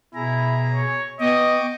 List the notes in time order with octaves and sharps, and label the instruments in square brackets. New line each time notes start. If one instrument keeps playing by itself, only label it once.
[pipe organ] B2 G#4 A#5 [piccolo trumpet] E4
[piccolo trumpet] C#5
[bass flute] B3 [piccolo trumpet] D#5 [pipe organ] G5 C#6 D6